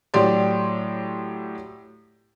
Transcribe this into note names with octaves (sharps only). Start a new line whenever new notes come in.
A2 F#3 G4 D5 C6